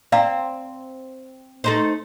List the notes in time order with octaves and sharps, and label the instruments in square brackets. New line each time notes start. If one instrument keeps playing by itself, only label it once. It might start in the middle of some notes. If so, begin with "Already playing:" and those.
[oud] C4 [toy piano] D5 F5 A#5
[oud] A3 D#4 C5